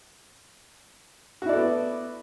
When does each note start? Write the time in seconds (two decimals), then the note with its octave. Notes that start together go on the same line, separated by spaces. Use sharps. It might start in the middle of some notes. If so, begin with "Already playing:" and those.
1.42 F#4
1.45 E4
1.49 D5
1.53 A4
1.56 B3